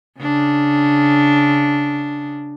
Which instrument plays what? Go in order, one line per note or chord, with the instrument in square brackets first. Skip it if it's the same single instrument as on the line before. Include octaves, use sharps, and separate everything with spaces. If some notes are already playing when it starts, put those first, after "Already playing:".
[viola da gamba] C#3 D4